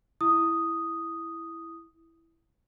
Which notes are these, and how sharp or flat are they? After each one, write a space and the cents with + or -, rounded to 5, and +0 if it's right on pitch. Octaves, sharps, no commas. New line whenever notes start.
E4 +0 D#6 +0